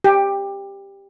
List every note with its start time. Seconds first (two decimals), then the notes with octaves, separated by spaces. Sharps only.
0.04 G4